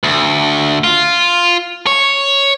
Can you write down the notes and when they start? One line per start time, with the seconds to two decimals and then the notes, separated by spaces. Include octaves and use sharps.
0.04 D2
0.84 F4
1.87 C#5